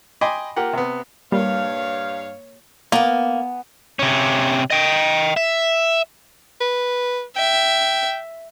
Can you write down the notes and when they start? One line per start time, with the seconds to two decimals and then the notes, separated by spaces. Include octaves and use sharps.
0.21 D#5 G5 G#5 B5 C6 D6
0.56 A#3 F4 G4 F#5
0.73 C3 B3
1.32 G2 G3 A#3 C#5 F5
2.92 A#3 B3 G#5
3.99 C3 C#4
4.71 D#5 G5
5.37 E5
6.60 B4
7.36 E5 G5